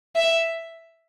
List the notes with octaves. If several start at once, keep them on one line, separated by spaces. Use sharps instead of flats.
E5